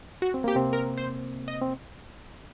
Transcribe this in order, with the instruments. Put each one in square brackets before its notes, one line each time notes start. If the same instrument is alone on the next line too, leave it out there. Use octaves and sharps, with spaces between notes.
[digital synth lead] F#4
[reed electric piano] C4
[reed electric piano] A#3 [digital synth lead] G4
[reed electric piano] C3 C4
[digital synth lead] A#4
C5
D#5
[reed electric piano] C4